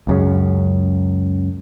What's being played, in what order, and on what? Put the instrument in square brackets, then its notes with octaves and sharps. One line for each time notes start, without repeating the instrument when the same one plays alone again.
[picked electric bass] C#2 F#2 C#3